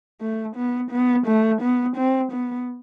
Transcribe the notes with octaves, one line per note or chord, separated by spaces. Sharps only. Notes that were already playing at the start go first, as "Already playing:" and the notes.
A3
B3
B3
A3
B3
C4
B3